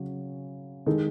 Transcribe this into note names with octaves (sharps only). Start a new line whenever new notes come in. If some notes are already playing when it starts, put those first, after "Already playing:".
Already playing: C#3 F#3 C#4
D#3 G#3 D#4 A4